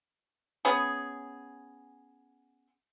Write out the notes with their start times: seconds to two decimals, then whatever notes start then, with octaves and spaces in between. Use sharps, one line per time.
0.65 B3 C#4 G#4